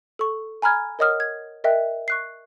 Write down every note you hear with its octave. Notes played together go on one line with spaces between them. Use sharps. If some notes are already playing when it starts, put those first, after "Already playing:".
A4 C#6
G#5 A#5 B5 F6 G#6
A#4 C#5 D#5 F#5 D#6 F6
G#6
A#4 D#5 E5 G5 F#6
C#6 F#6 C7